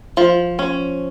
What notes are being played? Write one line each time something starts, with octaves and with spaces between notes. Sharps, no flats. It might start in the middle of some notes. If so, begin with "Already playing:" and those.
F3
C#4